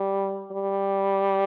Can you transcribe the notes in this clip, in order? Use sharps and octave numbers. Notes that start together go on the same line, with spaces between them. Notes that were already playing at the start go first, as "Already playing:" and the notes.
Already playing: G3
G3